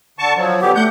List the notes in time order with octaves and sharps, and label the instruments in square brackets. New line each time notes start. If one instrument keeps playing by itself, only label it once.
[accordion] D3 A5 C#6
F3 F#3
[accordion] D3 B3 G4 [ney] F#5
[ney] A3 [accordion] F#5 G6